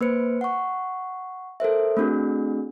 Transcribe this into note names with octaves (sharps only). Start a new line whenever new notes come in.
A#3 B4 C5 C#7
F#5 C#6
A4 A#4 C5 E5
A3 C4 D4 F#4 G#4